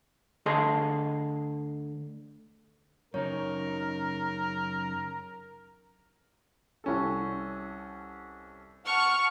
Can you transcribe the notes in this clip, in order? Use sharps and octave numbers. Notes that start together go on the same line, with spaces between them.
D2 D3 G#4 A4 D#5 C6
F#2 C#3 D#4 A#4 C#5
C2 C#4 A4
F#5 A5 C#6 F6